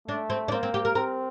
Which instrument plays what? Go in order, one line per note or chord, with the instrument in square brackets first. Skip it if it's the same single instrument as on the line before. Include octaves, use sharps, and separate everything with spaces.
[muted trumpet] A3 [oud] D4
[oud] C4
D4
[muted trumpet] A#3 [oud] C4
[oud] C4
G4
A#4
[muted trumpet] C4 [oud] A#4